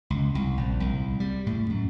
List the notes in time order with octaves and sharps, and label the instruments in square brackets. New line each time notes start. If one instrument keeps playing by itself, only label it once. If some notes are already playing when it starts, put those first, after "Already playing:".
[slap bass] C#2
C2
A#1
C2
G3
A2
F#2